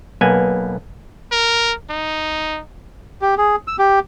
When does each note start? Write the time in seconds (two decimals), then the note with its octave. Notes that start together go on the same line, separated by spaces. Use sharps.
0.21 B1 A#3 B3 G#5
1.32 A#4
1.90 D#4
3.22 G4
3.38 G#4
3.68 E6
3.79 G4